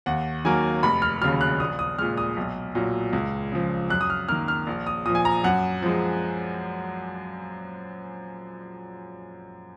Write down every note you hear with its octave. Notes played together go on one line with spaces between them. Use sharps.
D#2 F#5
D#3 F#3 A#3 G#5
F1 B5
F6
D#2 C#3 F#3 F6
F#6
A#1 D#6
D#6
A#2 G#3 F6
D#6
B1
A#2 F#3
C#2
C#3 F3
F#2 F#6
D#6
F6
D#3 A#3 F6
F6
A#1
D#6
A#2 F3 D#6
G#5
A#5
F#2 F#5
F3 G#3